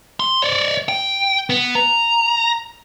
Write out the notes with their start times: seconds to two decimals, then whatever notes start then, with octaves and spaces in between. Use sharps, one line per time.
0.20 C6
0.43 C#5 D5
0.89 G5
1.50 B3
1.75 A#5